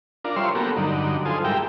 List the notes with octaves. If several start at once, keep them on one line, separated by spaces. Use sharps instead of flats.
D4 F4 A#4
G3 F4 C5 C#5 E5 C6
A#3 B3 F#4 G4 A4 A#4
G2 D3 F#3 D#4
F4 A4 C5 G#5 D#6
G#2 G3 G4 A#4 E5 G5